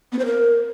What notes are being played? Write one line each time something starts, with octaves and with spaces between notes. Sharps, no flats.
B3
C5
A#4